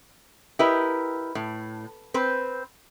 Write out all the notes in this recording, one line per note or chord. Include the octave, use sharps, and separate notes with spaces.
E4 G4 A#4 B4 D#5
A2
C4 B4 C5